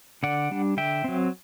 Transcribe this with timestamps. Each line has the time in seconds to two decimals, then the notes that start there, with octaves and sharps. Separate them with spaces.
0.23 D3 D5 F#5
0.51 G3 D4
0.77 D3 E5 G5
1.04 F#3 C4